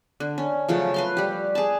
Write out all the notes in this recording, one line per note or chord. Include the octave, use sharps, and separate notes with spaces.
D3
C#4
C#3 F3 F#3 A3
B4 F5 C6
G3 G4
G#4 A5